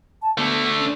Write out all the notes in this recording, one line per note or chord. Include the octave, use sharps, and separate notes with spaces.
A5
D3 A3 B3
C#4